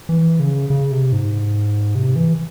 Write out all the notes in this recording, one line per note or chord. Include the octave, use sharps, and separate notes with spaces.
E3
C#3
C#3
C3
G#2
C3
E3